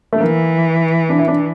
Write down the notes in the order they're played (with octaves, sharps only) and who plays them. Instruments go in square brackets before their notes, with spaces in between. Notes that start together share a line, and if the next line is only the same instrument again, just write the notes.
[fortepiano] A3
[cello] E3 [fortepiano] A#3
[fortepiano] D4
E4
D4